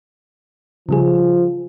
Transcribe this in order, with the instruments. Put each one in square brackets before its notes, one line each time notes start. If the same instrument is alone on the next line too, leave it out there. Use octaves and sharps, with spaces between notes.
[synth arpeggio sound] C#3 G3 G#4 [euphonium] F3